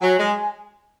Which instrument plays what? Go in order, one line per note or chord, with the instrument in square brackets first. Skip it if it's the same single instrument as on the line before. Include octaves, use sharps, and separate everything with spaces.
[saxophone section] F#3 [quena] G#5
[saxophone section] G#3